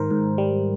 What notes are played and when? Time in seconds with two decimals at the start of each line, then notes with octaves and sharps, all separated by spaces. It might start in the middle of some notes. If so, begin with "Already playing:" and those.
Already playing: G#2 D#3 A#4 C5
0.11 G#2
0.38 G3